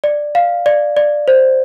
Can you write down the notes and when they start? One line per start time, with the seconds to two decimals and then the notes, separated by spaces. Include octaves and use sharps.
0.04 D5
0.35 F5
0.66 D5
0.97 D5
1.28 C5